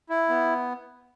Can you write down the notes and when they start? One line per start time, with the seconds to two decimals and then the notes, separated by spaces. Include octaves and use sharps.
0.10 E4
0.29 B3